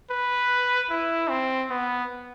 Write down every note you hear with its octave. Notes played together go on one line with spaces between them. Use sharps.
B4
E4
C4
B3